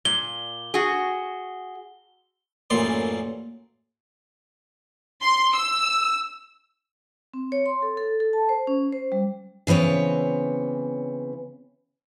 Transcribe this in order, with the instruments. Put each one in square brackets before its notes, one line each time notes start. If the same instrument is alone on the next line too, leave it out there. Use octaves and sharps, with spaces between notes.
[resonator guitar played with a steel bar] A#2 [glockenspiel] G7
[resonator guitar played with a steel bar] F#4 G#4
[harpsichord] A1 F#2 A#2 E3 D5 C6
[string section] C6
E6
[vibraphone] C4
C#5
C6
A4
A4
A4
A5
C5
C#4
C5
G3
[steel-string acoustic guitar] C#3 E3 B3 C4 C#5